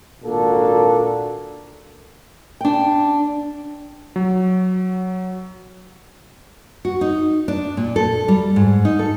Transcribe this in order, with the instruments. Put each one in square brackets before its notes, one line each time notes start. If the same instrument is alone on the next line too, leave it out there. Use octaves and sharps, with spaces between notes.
[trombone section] G#1 A#2 A#3 D4 F#4 A4
[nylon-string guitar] D4 G5
[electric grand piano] F#3
[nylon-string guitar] F#4
D#4
D4
A#2
A4
G3
G#2
D#4
A4